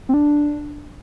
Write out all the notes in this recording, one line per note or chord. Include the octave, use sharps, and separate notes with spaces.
C4
D4